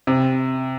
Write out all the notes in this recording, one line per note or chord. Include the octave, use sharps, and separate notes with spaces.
C3